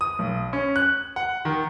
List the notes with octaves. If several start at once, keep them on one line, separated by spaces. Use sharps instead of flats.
D#6
B1
C#4
F#6
F#5
D#3